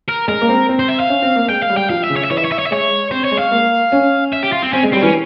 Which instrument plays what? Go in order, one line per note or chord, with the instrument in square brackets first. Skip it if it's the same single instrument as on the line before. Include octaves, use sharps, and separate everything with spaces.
[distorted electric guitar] A#4
[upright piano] G#3 [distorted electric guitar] A#4
[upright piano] A#3
C4
C4
[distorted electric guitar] C5
E5
F5
[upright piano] C#4
C4
A#3
[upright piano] G#3 [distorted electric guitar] G5
[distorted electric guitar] F5
[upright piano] G3
[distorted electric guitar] G5
[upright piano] F3 [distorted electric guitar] F5
[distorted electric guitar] E5
[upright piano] C#3
[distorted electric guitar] C#5
E5
[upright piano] E3 [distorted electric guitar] C#5
[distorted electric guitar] E5
C#5
E5
C#5
E5
[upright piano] G#3 [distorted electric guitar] C#5
[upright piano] C4 [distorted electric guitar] C5
[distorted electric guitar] C#5
[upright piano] G#3
[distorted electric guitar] F5
[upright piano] A#3
C#4
[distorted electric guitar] E5
G4
F4
C4
[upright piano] C4 [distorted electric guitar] C#4
[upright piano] G#3
[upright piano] G3 [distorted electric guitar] C4
[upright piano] E3 [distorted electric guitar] C#4